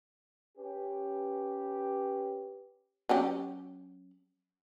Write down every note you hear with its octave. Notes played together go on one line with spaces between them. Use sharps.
C#4 G4 B4
F#3 C#4 G4